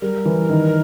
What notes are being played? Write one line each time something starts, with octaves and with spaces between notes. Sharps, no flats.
G3 A#4
E3
D#3